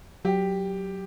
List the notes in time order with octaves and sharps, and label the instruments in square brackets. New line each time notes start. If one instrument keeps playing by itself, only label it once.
[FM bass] F#3 [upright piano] G4